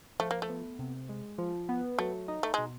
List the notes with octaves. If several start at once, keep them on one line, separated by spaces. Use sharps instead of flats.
F3 A3
A#3
A3
B3
C3
G#3
F3
B3
F#3 A3
D#4
A3
B2 G#3